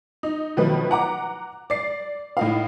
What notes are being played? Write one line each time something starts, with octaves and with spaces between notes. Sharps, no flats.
D#4
B2 D#3 F3 F#3 A3 B4
F#5 A#5 D6
D5 C7
A2 D#4 F5